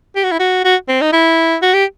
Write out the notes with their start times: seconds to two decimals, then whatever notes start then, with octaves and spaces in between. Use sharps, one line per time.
0.16 G4
0.24 F#4
0.31 E4
0.39 F#4
0.65 F#4
0.88 C4
1.01 D#4
1.13 E4
1.62 F#4
1.74 G4